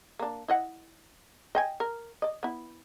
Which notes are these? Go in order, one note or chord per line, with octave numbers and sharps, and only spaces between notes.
A#3 D4
E4 D#5 F#5
D#5 G5 G#5
A#4
D5 D#5
B3 E4